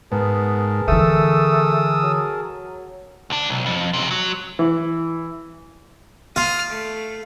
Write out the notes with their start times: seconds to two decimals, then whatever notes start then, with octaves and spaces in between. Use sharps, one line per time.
0.12 G#2 B3 G#4 A#4 A5
0.88 D3 E3 A3 D#6 E6
2.03 F#3
3.30 D2 D4
3.49 B1
3.66 F2
3.93 B1 C3
4.11 F#3
4.59 E3
6.36 F4 D#6 F6
6.70 A3